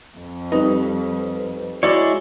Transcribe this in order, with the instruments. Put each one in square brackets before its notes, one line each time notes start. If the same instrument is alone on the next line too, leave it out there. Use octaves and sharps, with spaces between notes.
[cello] F2
[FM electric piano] G3 C4 B4 [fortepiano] D#4
[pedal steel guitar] G#3 E4 C#5 [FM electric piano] F#4 [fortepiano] D5